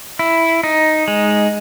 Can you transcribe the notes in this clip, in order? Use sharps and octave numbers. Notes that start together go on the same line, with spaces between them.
E4
D#4
G#3